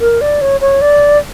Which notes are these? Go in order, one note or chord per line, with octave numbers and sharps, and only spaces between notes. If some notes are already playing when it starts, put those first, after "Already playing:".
A#4
D5
C#5
C#5
D5